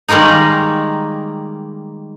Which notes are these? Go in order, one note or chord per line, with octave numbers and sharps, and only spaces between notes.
D#3 G3 G#3 A#3 D#4